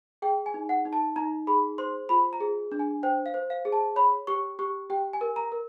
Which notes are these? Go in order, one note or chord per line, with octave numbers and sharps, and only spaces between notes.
G#4 G5
G#5
D#4
F#5
D#4
A5
D#4 A#5
G#4 B5
C5 C6
F4 B5
A#5
G#4
D4
G#5
C5 G5
F5
C5
F5
G#4
A5
C#5 B5
G4 C#6
G4 C#6
G4 G5
G#5
A#4
A#5
A#4